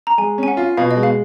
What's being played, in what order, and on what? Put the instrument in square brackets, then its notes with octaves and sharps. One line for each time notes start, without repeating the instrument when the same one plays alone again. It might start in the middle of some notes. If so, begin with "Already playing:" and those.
[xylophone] A#5
[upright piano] G#3 [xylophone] G#5
[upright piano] C#4 [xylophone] G#5
[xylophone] F#5
[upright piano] F4
[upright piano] B2 [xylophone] F5
[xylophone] D#5
[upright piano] G#3
[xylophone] F5